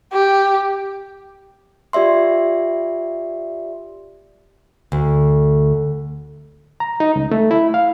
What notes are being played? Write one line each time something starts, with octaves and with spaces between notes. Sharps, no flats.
G4
F4 G4 D5 E5 C6
D2
A#5
D#4
C#2
A3
E4
F5